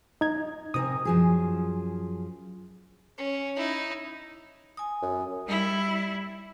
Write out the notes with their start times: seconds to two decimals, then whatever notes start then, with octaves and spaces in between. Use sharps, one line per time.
0.21 D#4 A#5 G#6
0.74 C3 A#4 G#5 D#6
1.05 F#2 F3 G#4
3.18 C#4
3.56 D#4 E4
4.77 G#5 D#6
5.02 F#2
5.47 G3 E4